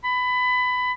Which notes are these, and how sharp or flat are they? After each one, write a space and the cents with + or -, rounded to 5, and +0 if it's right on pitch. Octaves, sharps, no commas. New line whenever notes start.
B5 +20